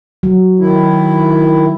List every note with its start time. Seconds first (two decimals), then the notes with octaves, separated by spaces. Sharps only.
0.23 F#3
0.59 D#3 E4